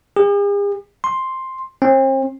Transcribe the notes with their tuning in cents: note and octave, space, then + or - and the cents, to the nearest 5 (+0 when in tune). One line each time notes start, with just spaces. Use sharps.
G#4 -45
C6 +5
C4 +40